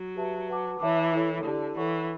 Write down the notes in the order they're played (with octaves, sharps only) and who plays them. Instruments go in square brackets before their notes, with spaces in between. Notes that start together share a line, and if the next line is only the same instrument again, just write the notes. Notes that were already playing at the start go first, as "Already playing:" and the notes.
Already playing: [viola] F#3
[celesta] G4 B4 E5 A5
B4 F#5 A5 D6
[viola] E3 [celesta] C#5 E5 A5 D6
[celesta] E4 A4 C#5
[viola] D3 [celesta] E4 G4 D5 A5
[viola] E3 [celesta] A4 C#5 F#5 C#6